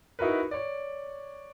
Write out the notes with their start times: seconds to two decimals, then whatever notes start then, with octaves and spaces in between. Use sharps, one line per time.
0.19 D#4 E4 F#4 A#4 B4
0.51 C#5 D5